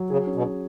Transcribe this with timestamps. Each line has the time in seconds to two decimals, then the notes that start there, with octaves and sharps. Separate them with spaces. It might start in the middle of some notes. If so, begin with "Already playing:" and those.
Already playing: F#3
0.10 C#3 G#4
0.27 C#4
0.35 B2
0.43 C#4